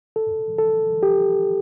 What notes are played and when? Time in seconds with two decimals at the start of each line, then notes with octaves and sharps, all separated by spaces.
0.16 A4
0.58 A4
1.03 G4